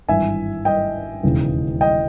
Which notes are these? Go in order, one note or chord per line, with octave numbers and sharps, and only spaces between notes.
G#1 G2 E3 E5 G#5
D#5 G5
E1 D#2 C#3 E3
D#5 G5